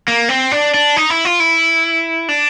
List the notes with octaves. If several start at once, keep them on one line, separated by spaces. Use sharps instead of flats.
A#3
C4
D4
D4
D#4
E4
F4
E4
D4